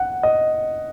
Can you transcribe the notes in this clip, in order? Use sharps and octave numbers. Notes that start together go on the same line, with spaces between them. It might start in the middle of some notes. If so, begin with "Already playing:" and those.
Already playing: F#5
D#5